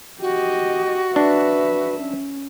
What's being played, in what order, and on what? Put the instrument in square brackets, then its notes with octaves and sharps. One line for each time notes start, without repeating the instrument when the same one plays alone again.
[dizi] F#4 [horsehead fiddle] G4 D#5
[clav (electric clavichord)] D4 [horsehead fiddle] B4 E5
[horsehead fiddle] C#4